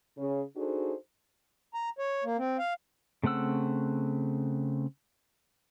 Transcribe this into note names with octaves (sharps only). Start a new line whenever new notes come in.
C#3
D4 D#4 F#4 G#4 A4 C5
A#5
C#5
A#3
C4
F5
C#3 A3 C4 F#5 E6